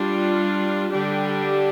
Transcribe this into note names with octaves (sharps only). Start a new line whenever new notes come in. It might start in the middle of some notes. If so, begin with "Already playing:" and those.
Already playing: G3 D4 F4
D3 G3 D4 G4